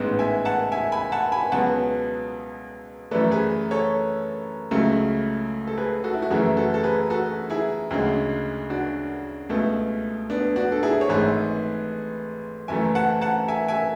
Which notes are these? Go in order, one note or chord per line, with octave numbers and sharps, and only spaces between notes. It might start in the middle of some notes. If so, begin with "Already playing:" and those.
Already playing: A1 G#2 G#3 B3
E5 G#5
F#5 A5
E5 G#5
G#5 B5
F#5 A5
G#5 B5
C#2 B2 F#3 B3 F#5 A5
F#2 E3 A3 B4 D5
G#4 B4
A4 C#5
C#2 C#3 F#3 A3
A4
G#4 B4
F#4 A4
E4
F#4
F#1 F#2 E3 A3 E4 G#4
F#4 A4
A4
G#4 B4
F#4 A4
E4 G#4
D2 C#3 G#3
D4 F#4
C#2 B2 A3
B3 D4
D4 F#4
A4
E4 G#4
C#5
G#1 G#2 E3 A3 G#4 B4
F#1 F#2 E3 A3 E5 G#5
F#5 A5
F#5 A5
E5 G#5
E5 G#5